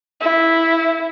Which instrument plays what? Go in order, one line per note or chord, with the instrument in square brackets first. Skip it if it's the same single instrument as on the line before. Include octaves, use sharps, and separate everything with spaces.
[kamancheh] E4